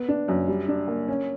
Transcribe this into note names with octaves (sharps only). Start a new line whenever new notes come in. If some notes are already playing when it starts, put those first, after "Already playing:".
Already playing: B3
D4
F#2
G3
D4
A#3
C#4